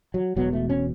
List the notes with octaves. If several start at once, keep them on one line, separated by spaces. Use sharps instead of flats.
F#3
E1 E2 B2 F#3
A3
C#4